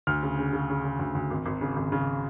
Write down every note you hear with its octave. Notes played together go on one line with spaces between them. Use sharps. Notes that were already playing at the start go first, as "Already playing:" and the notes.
D2 F6
C#3
C#3
C#3
C#3
C#3
D2
D2
G#1
G#1
C#3
G#1
C#3